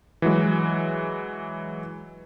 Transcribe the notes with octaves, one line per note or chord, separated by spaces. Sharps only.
E3 F#3 G#3